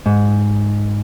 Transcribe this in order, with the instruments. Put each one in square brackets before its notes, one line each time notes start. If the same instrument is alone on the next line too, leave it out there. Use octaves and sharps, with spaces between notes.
[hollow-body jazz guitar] G#2